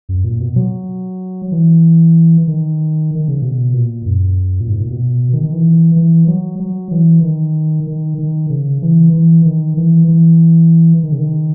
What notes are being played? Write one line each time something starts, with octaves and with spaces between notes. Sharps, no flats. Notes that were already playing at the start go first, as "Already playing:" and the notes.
F#2
A#2
B2
F#3
E3
D#3
D#3
C#3
B2
A#2
F#2
A#2
G#2
A#2
B2
D#3
D#3
E3
E3
F#3
F#3
E3
D#3
D#3
D#3
C#3
E3
E3
D#3
E3
E3
D#3
C#3
D#3